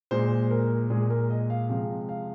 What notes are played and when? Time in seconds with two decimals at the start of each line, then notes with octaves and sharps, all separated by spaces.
0.11 A#2 G#3 C5
0.51 A#4
0.90 A#2 G#3 G#4
1.10 A#4
1.30 D#5
1.50 F5
1.69 C3 F3 G#3 F5
2.09 F5